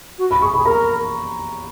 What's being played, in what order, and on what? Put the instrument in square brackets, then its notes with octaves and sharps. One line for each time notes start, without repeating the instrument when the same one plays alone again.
[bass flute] F#4
[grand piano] B5
[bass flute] G#4 [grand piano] C#6
[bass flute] G#4 [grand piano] B5
[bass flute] A#4 [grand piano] A#5